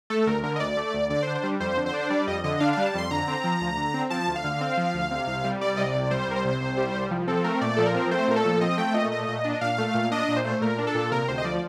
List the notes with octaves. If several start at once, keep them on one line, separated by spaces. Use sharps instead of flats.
A3 A4
D2 A#4
D3 A#4
D#5
D2 D5
A3
D2
D3 D5
C5
D4
C5
G3
F2 C5
D3
C5
D4
G3 D5
F2 D#5
D3 D#5
D4 F5
G3 F5
A5
F2 C6
D3 A#5
C4
F3
D2
D3
C4
F3 A5
D2
F5
D3
C4
F3
D2
C3
C2
G3
C2 D5
C3 D#5
D5
C2
G3 C5
C2 A#4
C5
C3
C2
G3
C2
F3
C4 A4
A3 A#4
A#2 D5
F3 A4
A#4
C4
A3 C5
A#2 A#4
A4
F3
C4 D#5
A3 G5
A#2 D#5
A3 D#5
A#2
D4
A#2 F5
A3
A#2
D4 D#5
A#2
C5
A3
A#2 A#4
D4
A4
A#2
C3 A#4
D2 C5
D#5
F3 D5